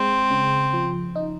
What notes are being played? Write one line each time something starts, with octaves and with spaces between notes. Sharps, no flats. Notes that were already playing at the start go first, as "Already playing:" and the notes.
Already playing: G#3 C4
C#3
F3
D#4